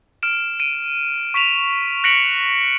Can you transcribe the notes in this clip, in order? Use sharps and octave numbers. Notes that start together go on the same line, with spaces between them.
F6 D7 E7
D7 D#7
C#6 B6 E7 F7
F#6 A#6 B6 C#7 D7 F#7